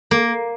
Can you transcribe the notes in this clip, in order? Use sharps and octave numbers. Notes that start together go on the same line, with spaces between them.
A#3